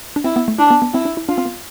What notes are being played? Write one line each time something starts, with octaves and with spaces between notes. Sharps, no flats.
D4
C4 E4
B3
A3
D4 E4
B3
B3
C4 E4
D4
E4
D4 F4
C4
B3